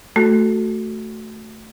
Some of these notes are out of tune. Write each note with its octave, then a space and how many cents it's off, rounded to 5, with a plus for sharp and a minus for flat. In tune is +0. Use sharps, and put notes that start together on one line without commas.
A3 +0 F#4 +0 A4 +0